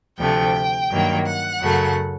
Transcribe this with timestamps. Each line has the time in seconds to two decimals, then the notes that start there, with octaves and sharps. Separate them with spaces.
0.18 D2 C3 F3 A3 G5
0.90 G2 D#3 F#3 A#3
1.26 F#5
1.61 F#2 C#3 F#3 A3